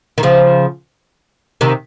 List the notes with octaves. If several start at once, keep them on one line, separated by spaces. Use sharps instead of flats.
D#3
C#3 F3
C3 D#3